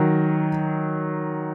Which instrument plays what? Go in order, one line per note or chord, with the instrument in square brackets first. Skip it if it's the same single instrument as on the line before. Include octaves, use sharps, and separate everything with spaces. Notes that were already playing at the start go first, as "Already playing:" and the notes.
Already playing: [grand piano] D#3 F#3